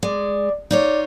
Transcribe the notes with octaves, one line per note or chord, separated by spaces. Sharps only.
G#3 D5
D#4 F4 C#5 D5